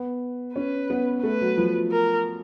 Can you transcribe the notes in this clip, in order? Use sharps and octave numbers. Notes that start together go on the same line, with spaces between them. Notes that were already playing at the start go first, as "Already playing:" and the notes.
Already playing: B3
C#4 B4
B3
A3 B4
F#3
F3
A#4